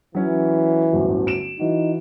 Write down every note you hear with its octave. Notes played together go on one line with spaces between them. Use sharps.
E3 F#3 C#4
D1 G1 F#2
D7 E7
E3 D#4 F#4